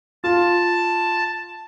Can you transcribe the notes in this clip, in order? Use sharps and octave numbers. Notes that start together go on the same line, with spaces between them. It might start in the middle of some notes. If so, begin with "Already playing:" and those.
F4 A5